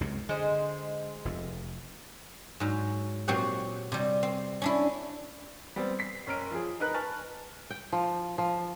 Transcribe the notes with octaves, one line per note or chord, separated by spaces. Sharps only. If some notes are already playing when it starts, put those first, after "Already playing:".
C#2 F#2 C3
D3 G#3 C5
F1 F2
G#2 F#3
A#2 F#3 C4 F#4 G4 F#5
C3 G3
C4
C#4 D4 E4
G3 B3 C4
B6 C7
F#1 C#4 A#4 F6 D7
F3 G#4
D#4 A#4 B4 F#6
B4 G#5 A5 C#6 F6 A6
G5
F3
F3